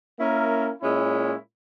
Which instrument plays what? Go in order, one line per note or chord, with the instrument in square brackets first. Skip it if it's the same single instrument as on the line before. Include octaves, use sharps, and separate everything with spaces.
[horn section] A#3 C#4 E4 A#4
A#2 G#3 C#4 E4